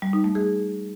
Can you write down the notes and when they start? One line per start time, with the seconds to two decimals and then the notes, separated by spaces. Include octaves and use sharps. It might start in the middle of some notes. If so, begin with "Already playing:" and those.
0.02 G3
0.13 D#4
0.24 A3
0.35 G#4